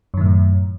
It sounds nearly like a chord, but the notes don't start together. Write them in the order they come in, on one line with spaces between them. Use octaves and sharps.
F#2 D#3 A2